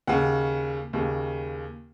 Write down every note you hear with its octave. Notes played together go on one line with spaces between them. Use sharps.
D#2 C#3 F#5
D#2 C#3